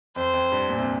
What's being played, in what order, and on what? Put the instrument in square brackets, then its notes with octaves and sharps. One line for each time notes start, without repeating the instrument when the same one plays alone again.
[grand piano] F2 [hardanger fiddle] C5
[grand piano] F2
G2
A#2
C3